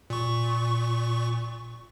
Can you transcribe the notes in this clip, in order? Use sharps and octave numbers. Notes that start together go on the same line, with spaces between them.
A#2 C#6